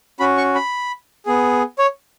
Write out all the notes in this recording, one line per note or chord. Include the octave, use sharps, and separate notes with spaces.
C#4 F#4 B5
C#6
B5
B3 G#4
C#5